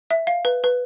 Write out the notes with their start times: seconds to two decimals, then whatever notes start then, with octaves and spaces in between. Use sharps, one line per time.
0.10 E5
0.27 F5
0.45 B4
0.64 B4